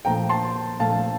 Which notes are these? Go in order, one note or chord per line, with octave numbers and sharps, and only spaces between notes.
A#2 F3 A3 G5 A#5
A5 C6
A#2 F3 A3 F5 A5